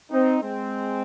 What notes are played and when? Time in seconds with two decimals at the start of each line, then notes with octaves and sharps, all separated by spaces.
0.11 C4 D#4
0.42 G#3 C4